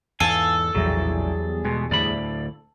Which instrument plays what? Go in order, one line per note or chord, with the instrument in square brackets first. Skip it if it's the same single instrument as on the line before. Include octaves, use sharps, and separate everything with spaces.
[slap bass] E2 G#2 E3 [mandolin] A4 [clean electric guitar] F5 G#5
[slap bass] A#1 A2 C3 [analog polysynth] E2 G3 G#4 [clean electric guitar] E3 F#3
[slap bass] B2 [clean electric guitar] G#3
[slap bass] D2 A2 D3 [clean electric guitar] D5 B5